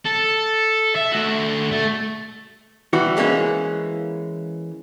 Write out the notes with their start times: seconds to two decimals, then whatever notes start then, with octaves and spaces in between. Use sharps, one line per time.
0.05 A4
0.96 E5
1.12 A3 F#4
1.71 A3
2.93 E3 G3 F#4
3.17 E3 G#3 A#3 C#4